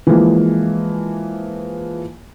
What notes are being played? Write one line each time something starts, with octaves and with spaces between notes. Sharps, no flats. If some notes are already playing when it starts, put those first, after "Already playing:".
E3 F3 G#3 A#3